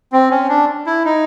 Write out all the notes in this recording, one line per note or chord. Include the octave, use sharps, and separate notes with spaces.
C4
C#4
D4
E4
D#4